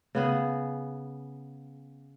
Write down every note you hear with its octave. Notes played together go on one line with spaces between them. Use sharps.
C#3 B3 G#4